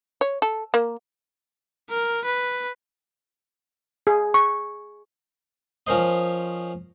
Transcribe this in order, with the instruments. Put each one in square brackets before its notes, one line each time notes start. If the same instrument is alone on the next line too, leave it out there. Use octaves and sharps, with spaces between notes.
[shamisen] C#5
A4
A#3
[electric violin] A#4
B4
[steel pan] G#4
C#6
[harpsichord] F3 C#4 A#4 C5 D#5